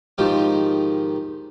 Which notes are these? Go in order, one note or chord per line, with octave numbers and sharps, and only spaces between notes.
G#2 D#3 F3 G4